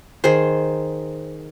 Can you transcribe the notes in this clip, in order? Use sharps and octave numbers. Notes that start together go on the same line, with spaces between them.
D#3 G#4 C5